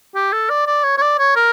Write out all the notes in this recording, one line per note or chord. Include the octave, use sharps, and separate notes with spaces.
G4
A4
D5
D5
C#5
C#5
D5
C#5
A#4